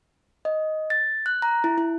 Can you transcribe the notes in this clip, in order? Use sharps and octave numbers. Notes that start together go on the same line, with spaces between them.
D#5
A6
F#6
A#5
E4
E4